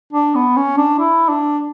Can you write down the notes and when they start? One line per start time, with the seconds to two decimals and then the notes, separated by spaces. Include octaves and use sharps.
0.13 D4
0.35 B3
0.57 C#4
0.78 D4
0.99 E4
1.29 D4